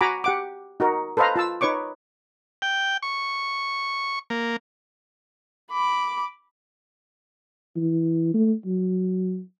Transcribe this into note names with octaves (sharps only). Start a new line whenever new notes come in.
F#4 F#5 G#5 A#5 B5 D6
G4 F#5 D6
D#4 F#4 A#4
A4 B4 C5 D#5 F5 A#5
F4 A5 E6
D#4 B4 C#5 C#6 D6
G5
C#6
A#3
B5 D6
E3
A3
F#3